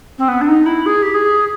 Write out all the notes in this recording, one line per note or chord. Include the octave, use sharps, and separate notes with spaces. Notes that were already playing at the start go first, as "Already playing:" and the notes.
C4
B3
D4
D#4
E4
G#4
G4
G#4